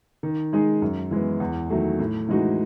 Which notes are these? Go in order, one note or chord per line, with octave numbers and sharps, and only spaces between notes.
D#3
G#3 D#4 G#4
F#2
E3 G#3 B3
E2
D#3 F#3 A3
A2
E3 G#3 D#4 F#4